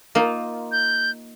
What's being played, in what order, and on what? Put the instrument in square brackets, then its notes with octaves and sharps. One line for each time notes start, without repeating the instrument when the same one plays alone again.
[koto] A#3 D#4 F4
[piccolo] G6